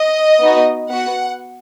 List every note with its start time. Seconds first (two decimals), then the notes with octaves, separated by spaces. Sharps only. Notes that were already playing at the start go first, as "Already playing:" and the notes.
Already playing: D#5
0.41 B3 D#4 F#4
0.91 B3 F#4 F#5